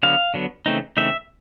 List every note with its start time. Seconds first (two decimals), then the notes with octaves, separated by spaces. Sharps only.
0.03 D3 F#3 B3 F5
0.34 D3 F#3 B3
0.66 C#3 E3 A3 C4 D#4
0.97 C#3 E3 A3 C4 D#4 E5